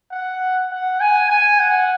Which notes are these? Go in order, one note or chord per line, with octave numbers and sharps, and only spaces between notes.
F#5
F#5
G#5
G#5
F#5